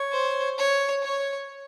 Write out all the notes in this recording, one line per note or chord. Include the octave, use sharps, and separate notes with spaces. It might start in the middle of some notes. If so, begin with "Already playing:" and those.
Already playing: C#5
C5
C#5
C#5